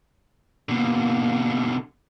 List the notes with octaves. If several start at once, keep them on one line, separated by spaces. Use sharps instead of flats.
B2 D3 A#3